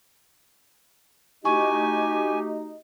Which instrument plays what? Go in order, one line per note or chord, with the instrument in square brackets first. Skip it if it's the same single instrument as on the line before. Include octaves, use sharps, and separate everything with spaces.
[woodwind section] A3 F#4 G4 [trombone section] D#4 [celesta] E4 C#6 [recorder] G#5